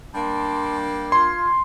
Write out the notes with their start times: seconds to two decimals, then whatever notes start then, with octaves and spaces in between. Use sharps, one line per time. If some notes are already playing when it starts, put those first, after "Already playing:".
0.13 G3 A#3 D4 A5 C6
1.12 F4 C6 G#6